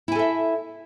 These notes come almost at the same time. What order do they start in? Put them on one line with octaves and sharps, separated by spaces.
E4 G#5 A4 E5